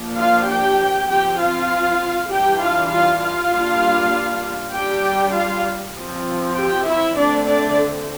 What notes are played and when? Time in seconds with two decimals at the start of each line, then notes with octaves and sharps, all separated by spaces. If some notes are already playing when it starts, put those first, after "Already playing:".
Already playing: F3 A#3 D4
0.16 F4 F5
0.47 G4 G5
1.08 F3 C4 G4 G5
1.38 F4 F5
2.29 E3 G3 D4 G4 G5
2.60 F4 F5
2.90 F4 F5
3.20 F4 F5
3.52 G3 A#3 D4
4.74 G3 D4 G4 G5
5.34 F4 F5
5.95 F3
6.00 C4
6.56 G4 G5
6.86 E4 E5
7.17 D3 A3 C4 D4 D5
7.47 D4 D5